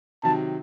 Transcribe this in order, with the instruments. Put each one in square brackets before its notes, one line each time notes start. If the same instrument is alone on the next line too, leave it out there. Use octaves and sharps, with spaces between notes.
[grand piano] C3 D#3 F#3 [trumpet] A5